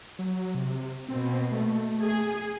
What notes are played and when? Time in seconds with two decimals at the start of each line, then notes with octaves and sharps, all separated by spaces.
0.19 F#3
0.55 C3
1.08 B2 A#3 C4
1.51 A3
2.03 G#4